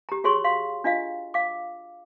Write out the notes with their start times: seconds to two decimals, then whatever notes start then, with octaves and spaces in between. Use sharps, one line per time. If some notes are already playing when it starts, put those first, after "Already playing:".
0.09 G4 A#5
0.24 F#4 G#4 C#5 C6 C#6
0.44 F5 C6
0.84 D4 F4 D#5 F5
1.34 F5 D6